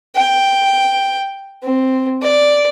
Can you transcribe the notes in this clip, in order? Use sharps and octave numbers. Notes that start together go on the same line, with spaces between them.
G5
C4
D5